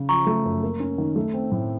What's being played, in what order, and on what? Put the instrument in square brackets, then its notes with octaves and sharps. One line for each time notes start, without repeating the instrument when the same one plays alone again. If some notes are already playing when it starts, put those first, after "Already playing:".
Already playing: [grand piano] C#3
[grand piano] F3 [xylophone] A#5 C#6
[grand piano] A3
F#2
A#3
C#4
D#3
A3
C4
A2